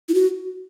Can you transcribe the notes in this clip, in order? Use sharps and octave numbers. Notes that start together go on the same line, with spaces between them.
E4
F#4